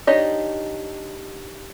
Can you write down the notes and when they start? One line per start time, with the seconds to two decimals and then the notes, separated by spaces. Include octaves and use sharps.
0.07 D4 D#4 G4 C#5 D#5